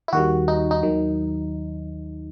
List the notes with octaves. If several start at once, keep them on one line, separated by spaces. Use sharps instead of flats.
E4
D#2 D#3 G3 F#4
D#4
D#4
D#2 D#3 F#3